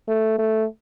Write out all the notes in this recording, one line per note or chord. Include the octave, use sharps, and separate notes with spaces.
A3
A3